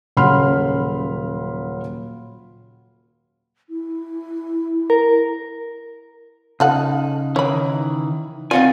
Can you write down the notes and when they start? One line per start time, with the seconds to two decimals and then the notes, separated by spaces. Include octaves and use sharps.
0.17 D#1 C#3 F#3 B5 C6 F6
3.70 E4
4.90 A#4
6.60 C#3 D#4 F4 A4 F#5
7.36 D#3 E3 C#5 B5
8.51 D#3 C4 F4 D5 F#5 G#5